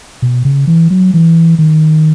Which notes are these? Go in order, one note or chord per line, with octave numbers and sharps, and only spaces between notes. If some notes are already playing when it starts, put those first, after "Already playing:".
B2
C#3
E3
F#3
E3
D#3